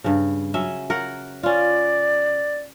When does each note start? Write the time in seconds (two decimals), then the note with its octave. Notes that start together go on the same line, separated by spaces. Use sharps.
0.04 G2 C#3
0.54 F#3 C#4 E5
0.90 A#4 C#5 F#5
1.43 C#4 F4 D5